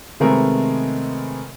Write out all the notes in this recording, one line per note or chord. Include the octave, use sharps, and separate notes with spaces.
C3 D#3 G#3 A3 B3 A#4